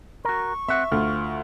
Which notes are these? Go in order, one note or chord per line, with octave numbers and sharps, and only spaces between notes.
F#4 A#4 C#6
C4 E5 F#5
D2 F4